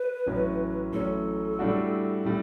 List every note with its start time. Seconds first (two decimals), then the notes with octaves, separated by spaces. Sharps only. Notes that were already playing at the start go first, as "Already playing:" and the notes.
Already playing: B4
0.26 A1 A2 F#3 C#4
0.93 A1 A2 F#3 C#4 A4
1.59 A2 G3 D4 F#4
2.25 A2 G3